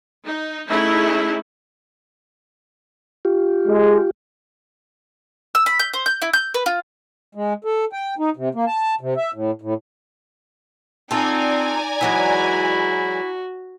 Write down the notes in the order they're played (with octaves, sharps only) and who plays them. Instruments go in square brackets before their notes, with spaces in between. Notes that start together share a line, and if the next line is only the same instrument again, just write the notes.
[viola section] D#4
A3 C#4 D#4 E4 G#4
[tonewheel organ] F4 G4
[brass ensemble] G#3
[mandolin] E6
B5
G6
C5
G6
E4
G6
B4
F4
[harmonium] G#3
A4
G5
D#4
C3
A#3
A5
C3
E5
A2
A2
[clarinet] C4 [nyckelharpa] D#4 [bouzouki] F4 A4 [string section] D5 G#5 A#5
[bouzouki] E3 F#3 G#3 [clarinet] E4 [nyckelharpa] F#4